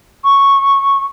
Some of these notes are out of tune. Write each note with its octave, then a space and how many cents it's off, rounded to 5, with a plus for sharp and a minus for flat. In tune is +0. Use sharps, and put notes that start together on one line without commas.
C#6 -5